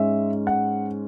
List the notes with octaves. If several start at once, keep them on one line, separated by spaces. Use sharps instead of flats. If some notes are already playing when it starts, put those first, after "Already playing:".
Already playing: G#2 G#3 C#4 E5
F#5